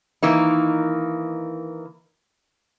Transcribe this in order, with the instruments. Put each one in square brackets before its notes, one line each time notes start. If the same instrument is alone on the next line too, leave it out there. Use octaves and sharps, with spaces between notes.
[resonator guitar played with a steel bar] D#3 E3 A#3 D#4